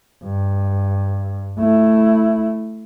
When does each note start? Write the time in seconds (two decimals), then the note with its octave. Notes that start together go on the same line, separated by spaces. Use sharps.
0.24 G2
1.58 A3 E4